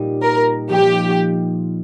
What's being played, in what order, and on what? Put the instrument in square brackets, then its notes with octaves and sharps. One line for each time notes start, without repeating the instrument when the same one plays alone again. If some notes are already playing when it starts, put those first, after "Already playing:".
Already playing: [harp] A#2 G3 D#4
[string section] A#4
[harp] F3 A#3 D#4 [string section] G4